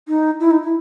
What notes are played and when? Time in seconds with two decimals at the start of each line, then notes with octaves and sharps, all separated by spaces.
0.08 D#4
0.40 E4
0.51 D#4
0.62 E4